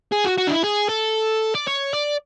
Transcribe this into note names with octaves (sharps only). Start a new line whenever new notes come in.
G#4
F#4
F#4
D4
E4
G#4
A4
D5
C#5
D5